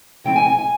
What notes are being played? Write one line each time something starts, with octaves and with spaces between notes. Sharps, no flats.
C#3 F3 C4 E4 G5
G#5
G#5
G#5